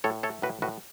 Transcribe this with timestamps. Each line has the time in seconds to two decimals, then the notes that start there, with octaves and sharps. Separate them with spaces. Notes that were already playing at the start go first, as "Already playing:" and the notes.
0.04 A2 A4 C#5
0.23 A3 A4 C#5
0.42 A2 F#4 B4
0.62 A2 F#4 B4